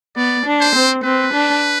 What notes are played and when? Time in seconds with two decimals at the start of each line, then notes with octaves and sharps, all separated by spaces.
0.17 B3 D5
0.46 D4
0.61 C5
0.75 C4
1.04 C4 B4
1.33 D4